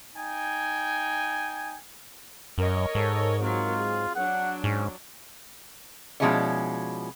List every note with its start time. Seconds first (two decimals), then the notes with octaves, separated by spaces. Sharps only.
0.16 D#4 G5 G#5
2.58 F#2 A#4 C#5 D#5
2.95 G#2 A4
3.41 F#3 C4 F4 A#4
3.75 G#4
4.16 F#3 D4 F#5
4.64 G#2 C#4
6.20 B2 F3 G#3 C#4 E4 D5